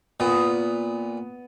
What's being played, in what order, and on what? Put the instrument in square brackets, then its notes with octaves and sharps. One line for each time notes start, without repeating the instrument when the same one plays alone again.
[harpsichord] A#2 [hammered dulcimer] B3